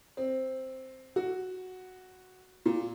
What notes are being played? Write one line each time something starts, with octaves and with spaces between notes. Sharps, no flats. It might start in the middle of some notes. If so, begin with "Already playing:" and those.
C4
F#4
A#2